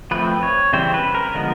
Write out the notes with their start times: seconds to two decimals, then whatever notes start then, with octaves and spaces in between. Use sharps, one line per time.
0.11 F3 A3 C4 B4
0.43 C#5
0.73 C#3 E3 G3 C4 C5
0.94 B4
1.15 A#4
1.34 D3 F3 G#3 B3